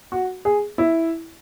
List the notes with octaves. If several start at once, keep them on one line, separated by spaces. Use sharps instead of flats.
F#4
G#4
E4